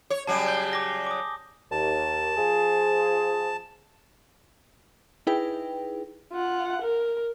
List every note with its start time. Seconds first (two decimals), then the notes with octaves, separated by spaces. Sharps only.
0.10 C#5
0.27 C#3 F#3 G3 G#5 A5
0.48 G6 G7
0.73 D6 A#6
1.07 D6 D#6
1.71 D#2 A5
2.37 F3 G#4
5.27 D#4 E4 G#4 B4 G5
6.32 F4 F#5
6.82 A#4